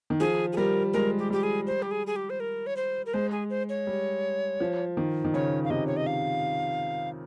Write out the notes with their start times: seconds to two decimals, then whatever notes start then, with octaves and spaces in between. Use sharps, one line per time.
0.10 D#3
0.20 F3 G#4
0.53 G#4
0.57 G3 A#4
0.93 G#3 A#4
1.19 G4
1.30 G3 G4
1.43 G#4
1.67 C5
1.82 G4
1.91 G#4
2.07 G#4
2.16 G4
2.30 C5
2.40 A#4
2.67 C#5
2.76 C5
3.06 A#4
3.14 G#3 C5
3.31 G#4
3.50 C5
3.69 C#5
3.87 G3
4.60 F3
4.97 D#3
5.24 D#3
5.34 C#3 C#5
5.64 F5
5.70 C3 D#5
5.87 C#5
5.97 D#5
6.07 F5